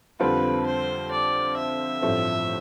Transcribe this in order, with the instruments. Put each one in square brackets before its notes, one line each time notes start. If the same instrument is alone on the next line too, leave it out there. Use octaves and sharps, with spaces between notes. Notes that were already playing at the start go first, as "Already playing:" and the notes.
[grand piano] F2 D3 G3 C4 F4 [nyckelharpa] B4
[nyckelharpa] C5
D5
E5
[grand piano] A1 G2 F3 A3 C4